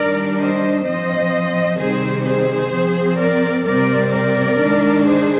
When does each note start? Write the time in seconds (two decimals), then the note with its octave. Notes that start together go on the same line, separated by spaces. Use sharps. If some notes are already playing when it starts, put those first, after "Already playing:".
Already playing: D#3 G3 D4 A#4 D5
0.39 C5 D#5
0.85 F3 C4 C5 D#5
1.78 C3 D#3 G3 C4 G#4 C5
2.25 G#4 C5
2.73 F3 C4
3.19 A#4 D5
3.66 C3 G3 C4 A#4 D5
4.12 A#4 D5
4.59 D#3 G#3 D4
5.06 G#4 C5